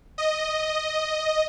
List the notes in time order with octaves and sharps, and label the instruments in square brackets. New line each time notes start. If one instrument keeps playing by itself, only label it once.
[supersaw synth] D#5